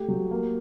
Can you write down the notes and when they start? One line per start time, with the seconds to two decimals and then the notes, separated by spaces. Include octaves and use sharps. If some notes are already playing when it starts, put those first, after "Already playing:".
Already playing: A3 G4
0.08 F#3
0.31 A#3